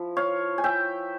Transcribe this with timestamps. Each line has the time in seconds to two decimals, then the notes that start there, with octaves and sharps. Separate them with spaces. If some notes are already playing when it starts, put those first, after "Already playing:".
Already playing: F3 E4
0.17 C#5 F5
0.58 G#5
0.64 E5 G5